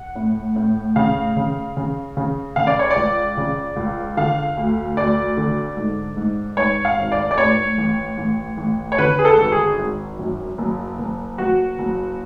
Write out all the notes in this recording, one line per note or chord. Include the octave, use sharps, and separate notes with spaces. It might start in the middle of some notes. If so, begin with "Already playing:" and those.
Already playing: F#5
A2
A2
C#3 F5
C#3
C#3
C#3
C#3 F5
D5
C#5
D5
C#2
C#3
C#2
D3 F5
D2
D2 D5
D3
G#2
G#2
G#2 C#5
F5
G#1
D5
D5
A2 C#5
A1
A1
A1
C#5
D3 B4
G#4
A4
G#1
G#4
G#1
F#2
F#1
F#1
F#1 F#4
F#1